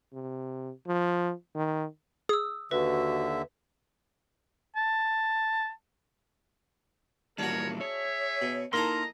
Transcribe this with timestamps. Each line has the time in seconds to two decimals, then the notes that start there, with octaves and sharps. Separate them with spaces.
0.13 C3
0.87 F3
1.55 D#3
2.29 G#4 D#6 E6
2.71 D#2 D3 F#4 B4 E5
4.76 A5
7.38 A#2 E3 G3 D4 F#4 A#4 C#5
7.80 G#4 C#5 E5
8.42 B2
8.73 A#3 D#4 E4 A4 A#4 D#5 A#5 C6